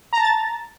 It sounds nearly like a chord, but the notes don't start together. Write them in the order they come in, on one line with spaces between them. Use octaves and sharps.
A#5 A5 A6